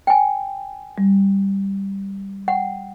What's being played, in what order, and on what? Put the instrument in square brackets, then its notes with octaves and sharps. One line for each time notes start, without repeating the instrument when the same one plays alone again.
[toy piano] G5 G#5
[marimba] G3
[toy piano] F#5 [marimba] G5